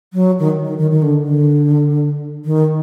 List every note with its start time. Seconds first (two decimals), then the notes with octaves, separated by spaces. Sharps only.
0.13 F#3
0.39 D#3
0.65 D#3
0.78 D#3
0.91 D#3
1.02 D3
1.24 D3
2.45 D#3